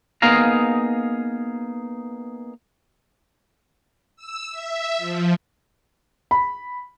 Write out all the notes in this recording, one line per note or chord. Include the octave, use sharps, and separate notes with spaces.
A#3 B3 D#4 G#4 F5 A#5
E6
E5
F3
B5